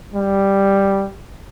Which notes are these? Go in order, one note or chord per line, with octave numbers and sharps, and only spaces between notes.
G3